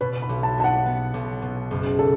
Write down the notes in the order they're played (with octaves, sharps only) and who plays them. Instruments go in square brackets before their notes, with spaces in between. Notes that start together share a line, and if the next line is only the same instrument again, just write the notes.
[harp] B2 [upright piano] B4
[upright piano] B5
[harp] B1
[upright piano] A5
[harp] B3 [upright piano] A5
[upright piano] F#5
[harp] B3
B1
B2
F#1
[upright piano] A4